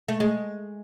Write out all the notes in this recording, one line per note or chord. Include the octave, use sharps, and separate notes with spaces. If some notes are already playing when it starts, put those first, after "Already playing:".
A3
G#3